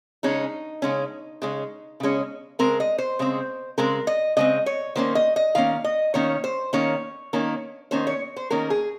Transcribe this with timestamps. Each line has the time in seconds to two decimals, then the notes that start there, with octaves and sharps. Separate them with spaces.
0.23 C#3 G#3 C#4 D#4
0.82 C#3 G#3 C#4
1.42 C#3 G#3 C#4
2.00 C#3 G#3 C#4
2.59 C#3 G#3 C4 A#4
2.80 D#5
2.98 C5
3.19 C#3 G#3 C4
3.78 C#3 G#3 C4 A#4
4.07 D#5
4.37 C#3 G#3 C4 D#5
4.66 C#5
4.95 D#3 A#3 C#4 C5
5.15 D#5
5.36 D#5
5.55 D#3 A#3 C#4 F5
5.84 D#5
6.14 D#3 A#3 C#4 C#5
6.44 C5
6.73 D#3 A#3 C#4 C#5
7.33 D#3 A#3 C#4
7.91 D#3 A#3 C#4 C5
8.07 C#5
8.37 C5
8.50 D#3 A#3 C#4 A#4
8.70 G#4